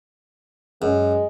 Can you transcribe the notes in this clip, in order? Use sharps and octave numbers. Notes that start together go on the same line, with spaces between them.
F#2 G#3